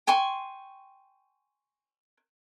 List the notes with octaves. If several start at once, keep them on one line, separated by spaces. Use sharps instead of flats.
G5 G#5 C6 C#6